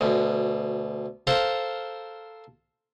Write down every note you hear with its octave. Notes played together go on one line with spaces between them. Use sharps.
D2 B2
A4 A#4 C5 F5 A#5